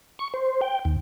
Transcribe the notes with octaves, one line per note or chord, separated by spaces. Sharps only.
C#6
C5
G5
D#2